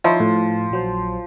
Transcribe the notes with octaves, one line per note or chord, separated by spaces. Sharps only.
F3 D#4 E4 C#5
A2
A#1 F#3 C5